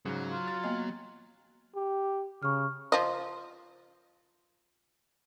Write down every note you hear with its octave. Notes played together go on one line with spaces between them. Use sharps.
G#2 C#3 F#3
F4
F6 A6
A#3 B3 D#5
G4
C#3 C#6 F6
F3 D#5